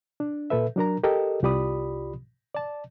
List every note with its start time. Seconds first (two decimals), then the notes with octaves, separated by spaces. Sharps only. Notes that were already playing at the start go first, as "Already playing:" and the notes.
0.20 D4
0.50 A#2 A4 B4 E5
0.76 F#3 D4 A#4 A#5
1.04 G4 A4 A#4 D#5 G5
1.43 C2 F4 G4 D5 B5 D#6
2.55 D5 A5